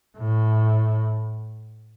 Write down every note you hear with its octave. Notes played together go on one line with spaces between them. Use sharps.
A2